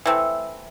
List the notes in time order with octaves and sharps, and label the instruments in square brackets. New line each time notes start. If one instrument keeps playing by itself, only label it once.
[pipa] E3 A3 C4